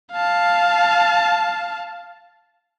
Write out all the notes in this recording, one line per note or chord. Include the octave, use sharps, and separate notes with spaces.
F5 A5